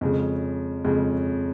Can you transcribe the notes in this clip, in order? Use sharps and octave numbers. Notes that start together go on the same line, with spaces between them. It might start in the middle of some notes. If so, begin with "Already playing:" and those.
F2 C#3 G#3
F2 C#3 G#3